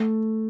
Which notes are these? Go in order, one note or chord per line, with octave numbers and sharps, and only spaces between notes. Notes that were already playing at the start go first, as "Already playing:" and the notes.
Already playing: A3